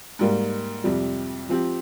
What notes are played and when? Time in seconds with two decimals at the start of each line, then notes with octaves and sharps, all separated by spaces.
0.19 G#2 G3 A#3
0.84 F2 C3 G3
1.48 F3 C4 G4